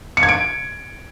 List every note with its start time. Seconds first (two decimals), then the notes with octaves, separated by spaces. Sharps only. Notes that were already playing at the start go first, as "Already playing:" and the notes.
0.17 C#7
0.23 G#6
0.29 D7